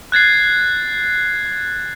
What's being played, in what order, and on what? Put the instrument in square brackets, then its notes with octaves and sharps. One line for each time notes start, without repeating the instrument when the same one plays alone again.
[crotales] F#6 G#6 A6 C7